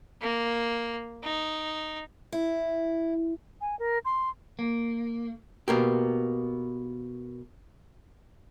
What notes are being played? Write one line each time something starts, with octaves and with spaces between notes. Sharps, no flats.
A#3
D#4
E4
G#5
A#4
C6
A#3
B2 A#3 G4